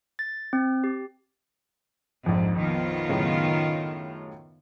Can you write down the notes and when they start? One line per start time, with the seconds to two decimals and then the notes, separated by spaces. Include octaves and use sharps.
0.19 A6
0.53 C4
0.84 G4
2.26 A#1 F2 G#2
2.58 D#3 B3 F4
3.09 F#2 A2 C#3